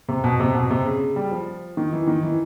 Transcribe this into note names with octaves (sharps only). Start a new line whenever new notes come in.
C3
B2
C3
B2
C3
C#3
G3
F3
D#3
E3
D#3
E3